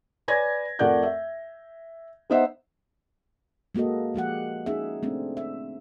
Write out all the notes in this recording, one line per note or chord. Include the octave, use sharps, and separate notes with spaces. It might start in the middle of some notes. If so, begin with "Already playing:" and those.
B4 C#5 D5 G#5 G#6 A#6
F2 A3 A#4 D5 F#5 G6
E5
B3 D#4 C5 D#5 E5 F#5
G#3 A#3 F#4 A4 D#5
F3 G#3 G4 F#5
C#4 D#4 G#4 E5
A3 C4 D4
E5